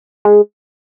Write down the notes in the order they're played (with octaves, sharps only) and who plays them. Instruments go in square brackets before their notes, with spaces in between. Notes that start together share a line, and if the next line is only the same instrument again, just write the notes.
[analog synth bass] G#3